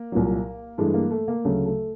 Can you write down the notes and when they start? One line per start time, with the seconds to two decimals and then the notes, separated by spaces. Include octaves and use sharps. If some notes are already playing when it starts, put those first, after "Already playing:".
Already playing: A#3
0.12 C2 A#2 F#3
0.78 G2 E3 G#3 A3
0.94 A#3
1.11 A3
1.28 A#3
1.44 D2 C#3 F#3 A3
1.66 A3